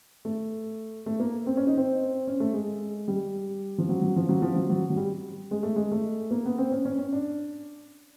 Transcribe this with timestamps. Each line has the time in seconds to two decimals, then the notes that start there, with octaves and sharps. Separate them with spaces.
0.25 A3
1.06 A3
1.20 A#3
1.46 C4
1.57 C#4
1.67 D#4
1.77 C4
2.27 C#4
2.40 A3
2.54 G#3
3.08 G3
3.78 F3
3.89 F#3
4.02 F#3
4.16 F3
4.29 F#3
4.42 F3
4.56 F#3
4.70 F#3
4.90 F#3
4.97 G3
5.51 G#3
5.63 A3
5.76 G#3
5.91 A3
6.31 A#3
6.45 B3
6.58 C4
6.72 C#4
6.85 C#4
6.98 C#4
7.12 D4